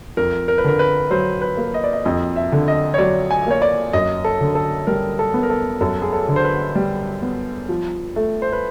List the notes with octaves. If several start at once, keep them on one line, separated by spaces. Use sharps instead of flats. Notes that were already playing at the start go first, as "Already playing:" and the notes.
F2 A#4
A#4
B4
D3 A#4
B4
F#3 C5
B4
A#3
D#5
D5
D#5
F2 D#5
E5
D3
D#5
C#5
F#3 D5
G#5
A#3 C#5
D5
F#2 D#5
A4
D3
A4
G3 A#4
A4
B3
A#4
A4
F#2 A4
G#4
A4
D3
C5
B4
G3
B3
F3
A3
C5
B4